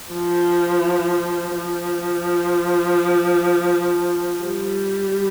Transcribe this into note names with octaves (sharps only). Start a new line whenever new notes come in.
F3
F3
G3